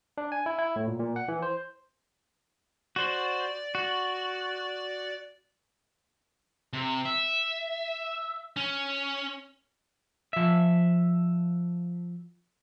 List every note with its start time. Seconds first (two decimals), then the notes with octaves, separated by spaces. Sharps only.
0.18 D4
0.32 G#5
0.46 E4
0.59 E4
0.76 A2
0.88 A#2
1.00 A#2
1.16 F#5
1.28 E3
1.42 C5
2.96 F#4 C5 D5
3.75 F#4
6.73 C3
7.05 E5
8.57 C#4
10.33 F3 E5